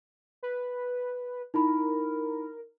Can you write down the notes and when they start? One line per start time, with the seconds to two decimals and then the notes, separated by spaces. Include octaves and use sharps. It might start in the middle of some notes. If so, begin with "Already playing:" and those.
0.43 B4
1.54 D#4 E4 A#4 B5